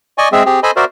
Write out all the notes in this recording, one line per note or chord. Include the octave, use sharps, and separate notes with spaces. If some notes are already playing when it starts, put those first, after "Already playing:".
D5 D#5 G#5 C#6
G#3 C4 G#4 E5
C4 G4 G#4
A4 C5 D#5 G#5 B5
F#4 A#4 C5 D5 E5